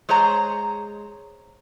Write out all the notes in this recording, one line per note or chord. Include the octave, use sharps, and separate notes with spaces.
G#3 G#4 C5 C#5 A#5